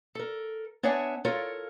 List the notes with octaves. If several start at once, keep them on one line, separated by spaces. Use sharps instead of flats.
A4 A#4
B3 D4 C#5 E5 F#5 G#5
F4 A4 A#4 C#5